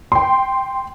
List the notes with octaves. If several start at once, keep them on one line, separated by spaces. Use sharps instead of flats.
G5 C6